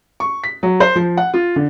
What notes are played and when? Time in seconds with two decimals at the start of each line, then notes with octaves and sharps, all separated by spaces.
0.20 C#6
0.44 B6
0.63 F#3
0.80 C5
0.96 F3
1.17 F#5
1.34 F4
1.56 D3